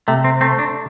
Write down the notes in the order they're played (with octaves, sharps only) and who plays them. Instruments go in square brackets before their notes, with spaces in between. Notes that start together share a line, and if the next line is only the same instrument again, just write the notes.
[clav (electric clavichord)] C3 [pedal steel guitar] A3
[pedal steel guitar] C4
[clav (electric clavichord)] A3 [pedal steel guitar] C4
[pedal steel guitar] D4